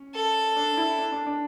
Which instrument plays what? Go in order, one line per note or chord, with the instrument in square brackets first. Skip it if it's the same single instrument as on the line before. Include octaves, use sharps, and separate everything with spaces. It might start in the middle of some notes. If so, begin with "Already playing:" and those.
Already playing: [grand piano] C#4
[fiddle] A4
[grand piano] D4
E4
D4
D4
D4